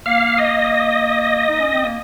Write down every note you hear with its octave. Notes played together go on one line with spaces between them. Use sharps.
A#3 F5
D#5
D#4
C#4
C4
A#3